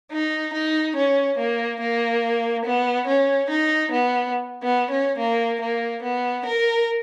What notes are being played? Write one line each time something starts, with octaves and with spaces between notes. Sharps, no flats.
D#4
D#4
C#4
A#3
A#3
B3
C#4
D#4
B3
B3
C#4
A#3
A#3
B3
A#4